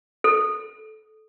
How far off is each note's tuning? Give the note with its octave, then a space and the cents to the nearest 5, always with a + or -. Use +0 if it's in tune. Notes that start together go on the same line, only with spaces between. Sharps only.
A4 -20